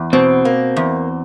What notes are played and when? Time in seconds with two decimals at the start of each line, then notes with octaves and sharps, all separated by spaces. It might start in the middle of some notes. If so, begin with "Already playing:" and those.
Already playing: E2
0.13 B2 C4
0.45 A#3
0.77 E2